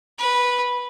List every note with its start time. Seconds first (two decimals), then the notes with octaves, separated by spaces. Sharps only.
0.18 B4